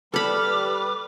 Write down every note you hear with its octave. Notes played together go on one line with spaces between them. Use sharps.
G3 A4 B4 B5 D6 F6